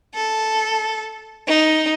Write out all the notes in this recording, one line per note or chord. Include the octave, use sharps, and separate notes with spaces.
A4
D#4